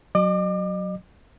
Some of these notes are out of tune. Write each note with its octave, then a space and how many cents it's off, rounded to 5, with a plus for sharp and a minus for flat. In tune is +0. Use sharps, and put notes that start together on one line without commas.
F#3 +0 D#5 -40 D6 +25